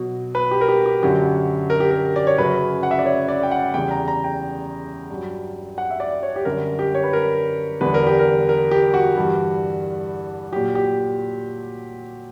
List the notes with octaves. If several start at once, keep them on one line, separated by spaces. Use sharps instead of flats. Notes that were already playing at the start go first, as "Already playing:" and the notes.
Already playing: B2 F#3
B4
G4
A#4
G4
G4
F#2 D3 F#3 G4
A#4
G4
A#4
D5
C#5
F#2 C#3 F#3 B4
F#5
E5
D5
C#5
D5
G5
F#5
E2 C#3 G3 G5
A#5
A#5
G5
G2 F#3
F#5
E5
D5
C#5
G4
F#2 D3 G3 A#4
G4
C#5
B4
A#4
E2 D3 G3 B4
A#4
G4
A#4
A#4
G4
F#4
G2 E3 G3
A#2 F#3 G4
G4